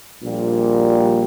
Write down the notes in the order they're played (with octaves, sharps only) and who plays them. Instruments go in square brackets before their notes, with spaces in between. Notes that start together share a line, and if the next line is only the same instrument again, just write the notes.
[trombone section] A#1 A#2 G3